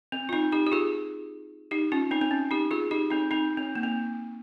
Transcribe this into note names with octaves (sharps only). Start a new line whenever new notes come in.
C4
F4
C4 D#4
D#4 G4
G4
F4 G#4
D#4 G4
C#4 F4
C4 D#4
C4
C#4
D#4 G4
F4 G#4
D#4 G4
C4 D#4
C4 D#4
C4
A#3
C4